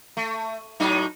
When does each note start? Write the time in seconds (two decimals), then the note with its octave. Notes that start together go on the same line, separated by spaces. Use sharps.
0.17 A3
0.80 A2 F#3 D#4